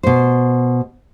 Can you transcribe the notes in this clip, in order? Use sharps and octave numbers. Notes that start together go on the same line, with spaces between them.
B2 C5